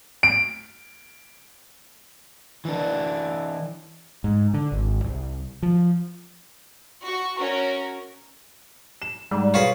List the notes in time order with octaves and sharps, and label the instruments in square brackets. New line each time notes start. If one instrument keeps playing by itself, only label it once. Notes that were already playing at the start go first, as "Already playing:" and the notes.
[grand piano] D7
[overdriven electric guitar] E3 D4
[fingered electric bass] G#2
D3
G#1
C2
F3
[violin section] F#4 C#6
C#4 F#4 A#4
[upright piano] E7
[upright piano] G#2 [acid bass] G3
[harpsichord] F4 F#4 B4 [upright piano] G#4 C#5